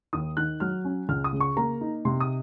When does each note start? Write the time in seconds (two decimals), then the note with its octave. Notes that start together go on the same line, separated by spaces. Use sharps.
0.13 D#2 D#6
0.37 D#3 F#6
0.60 F#3 F6
0.85 C#4
1.09 C#2 F6
1.24 D#6
1.32 C#3
1.40 C#6
1.57 A#3 A#5
1.81 D#4
2.05 C3 C6
2.20 D#6